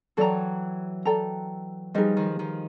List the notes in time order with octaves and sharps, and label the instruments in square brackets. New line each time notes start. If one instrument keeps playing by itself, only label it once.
[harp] E3 F#3 [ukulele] A4 D5 G5 A#5
[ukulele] A4 D5 G5 A#5
[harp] F3 G3 [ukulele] D#4 G#4 B4 D#5
[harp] D#3 F3
D#3 F3